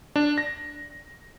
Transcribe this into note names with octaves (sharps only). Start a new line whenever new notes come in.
D4
A#6